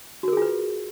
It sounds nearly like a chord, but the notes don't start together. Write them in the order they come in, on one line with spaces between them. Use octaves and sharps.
F#4 A#4 G#4 F4 B4